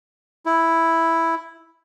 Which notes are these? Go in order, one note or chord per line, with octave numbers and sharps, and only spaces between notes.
E4